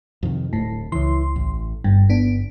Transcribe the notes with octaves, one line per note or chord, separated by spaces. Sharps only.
F2 C3 D#3
D1 A2
C#2 E3 C6
A1
G1 G2
B3 D4